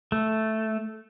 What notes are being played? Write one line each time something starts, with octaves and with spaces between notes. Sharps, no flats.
A3